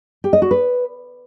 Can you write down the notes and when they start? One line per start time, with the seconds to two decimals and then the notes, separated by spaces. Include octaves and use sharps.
0.24 G4
0.33 D#5
0.42 F#4
0.51 B4